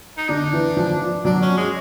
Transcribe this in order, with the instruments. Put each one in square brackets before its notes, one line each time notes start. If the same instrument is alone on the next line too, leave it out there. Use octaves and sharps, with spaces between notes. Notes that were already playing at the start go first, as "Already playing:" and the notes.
[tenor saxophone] D#4
[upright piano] D3 [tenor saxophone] D4
[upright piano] E3
F3
[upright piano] F#3 [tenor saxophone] D4
[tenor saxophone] C#4
G#3